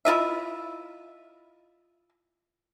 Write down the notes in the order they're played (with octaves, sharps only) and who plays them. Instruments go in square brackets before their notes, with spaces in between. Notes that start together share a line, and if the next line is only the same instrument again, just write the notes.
[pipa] E4 F4 D#5 E5